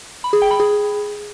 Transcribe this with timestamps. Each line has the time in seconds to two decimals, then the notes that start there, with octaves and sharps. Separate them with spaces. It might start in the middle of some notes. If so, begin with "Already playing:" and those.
0.24 B5
0.33 G#4
0.42 G5
0.51 B5
0.60 G#4